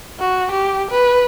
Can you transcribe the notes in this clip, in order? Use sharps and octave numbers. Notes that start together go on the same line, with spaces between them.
F#4
G4
B4